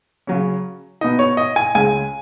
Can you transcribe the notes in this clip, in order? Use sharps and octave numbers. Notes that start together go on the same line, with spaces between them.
C#3 F#3 C#4
B2 B3 D#4 D#5
C#5
D#5
G#5
C#2 C#3 G#3 G#5